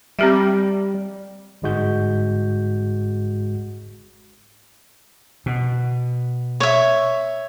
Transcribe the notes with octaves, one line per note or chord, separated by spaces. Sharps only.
G3 C4 G4 E5
G1 G#2 G#3 F#4 G6
B2
C#5 E5